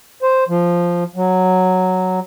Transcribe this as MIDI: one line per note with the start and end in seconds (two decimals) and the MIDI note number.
0.22 0.44 72
0.49 1.04 53
1.16 2.20 54